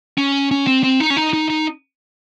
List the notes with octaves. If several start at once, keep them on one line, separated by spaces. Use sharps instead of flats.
C#4
C#4
C4
C4
D#4
C#4
D#4
D#4
D#4